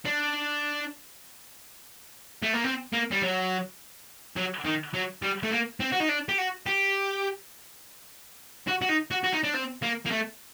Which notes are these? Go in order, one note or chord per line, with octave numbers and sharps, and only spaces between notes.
D4
A3
A#3
C4
A#3
G3
F#3
F#3
D#3
F#3
G3
A3
A#3
C4
F#4
D#4
D4
G4
F#4
G4
F#4
F#4
D#4
F#4
F#4
D#4
D4
C4
A#3
A#3
A3